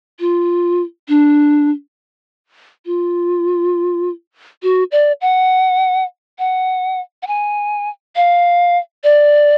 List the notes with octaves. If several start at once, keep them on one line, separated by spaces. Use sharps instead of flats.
F4
D4
F4
F#4
D5
F#5
F#5
F#5
G#5
F5
D5